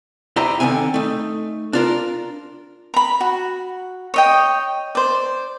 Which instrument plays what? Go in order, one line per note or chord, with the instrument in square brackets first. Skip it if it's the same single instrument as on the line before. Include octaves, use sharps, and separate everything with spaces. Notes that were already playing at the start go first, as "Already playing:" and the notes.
[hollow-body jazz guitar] E4 G4 C5 D#5 E5 A#5
D3 D#3 C4 D4 G#5
A3 D#4
D4 F4 A#4
[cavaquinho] A#5 B5
F#4
C#5 D#5 G5
C5 D5